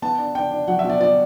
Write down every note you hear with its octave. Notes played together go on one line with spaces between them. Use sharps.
B3 A5
D4
D4 G5
D4
F#3 F#5
E5
B2
D5
B2 D5